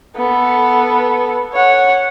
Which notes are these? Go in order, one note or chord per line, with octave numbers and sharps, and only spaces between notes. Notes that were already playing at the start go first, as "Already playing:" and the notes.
B3 A4
C#5 F#5